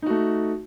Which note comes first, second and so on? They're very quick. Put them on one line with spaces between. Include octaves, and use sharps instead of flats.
D#4 F#4 A3